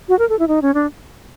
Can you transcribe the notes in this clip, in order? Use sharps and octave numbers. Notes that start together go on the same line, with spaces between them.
F#4
A#4
A4
E4
D#4
C#4
D4